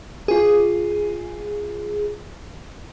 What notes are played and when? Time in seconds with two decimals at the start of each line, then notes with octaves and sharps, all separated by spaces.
0.28 F4 G#4